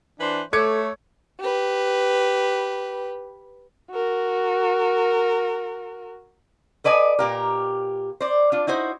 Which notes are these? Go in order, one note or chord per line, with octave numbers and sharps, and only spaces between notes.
E3 D4 B4 C5
A3 A4 C#5 D6 G#6 C#7
G4 B4
F#4 A#4
A4 B4 D5 D#5 G#5
A#2 G4 A#4
C5 D5
D4 F4
D#4 E4 F#4 C5